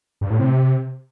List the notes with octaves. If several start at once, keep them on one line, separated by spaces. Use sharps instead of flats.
G2
A2
C3